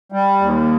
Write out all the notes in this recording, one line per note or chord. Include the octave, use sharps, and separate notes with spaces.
G3
D#2